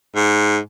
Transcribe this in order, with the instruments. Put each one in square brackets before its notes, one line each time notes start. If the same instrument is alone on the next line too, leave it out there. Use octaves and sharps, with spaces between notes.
[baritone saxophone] G#2